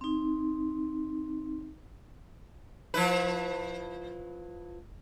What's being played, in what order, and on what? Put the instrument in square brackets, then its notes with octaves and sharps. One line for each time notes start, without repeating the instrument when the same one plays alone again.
[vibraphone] C4 D#4
[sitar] F3 E4 B4